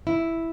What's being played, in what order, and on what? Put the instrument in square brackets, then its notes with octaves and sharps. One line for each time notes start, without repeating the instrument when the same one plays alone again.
[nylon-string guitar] E4